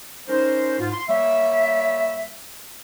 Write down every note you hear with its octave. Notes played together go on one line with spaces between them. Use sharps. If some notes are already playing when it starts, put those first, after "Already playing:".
G3 C#4 D#4 A#4 C5
G#2 F4
C6
G3 A#3 C#5 E5